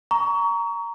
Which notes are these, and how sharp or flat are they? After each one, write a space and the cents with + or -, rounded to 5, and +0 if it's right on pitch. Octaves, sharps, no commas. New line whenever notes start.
A#5 +0 C#6 +30